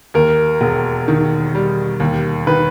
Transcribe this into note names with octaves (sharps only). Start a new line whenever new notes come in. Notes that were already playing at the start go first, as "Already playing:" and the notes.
D#2 A#4
E1
D#3
G3
D#2
D#3 B4